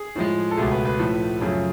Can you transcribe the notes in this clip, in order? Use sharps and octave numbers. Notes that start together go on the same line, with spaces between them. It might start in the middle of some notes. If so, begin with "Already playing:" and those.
Already playing: G#4
A2 F3 G#3
A4
C#2 B2 A3 G#4
B4
B4
A2 F3 A3
F#2 C#3 F3 A3 G#4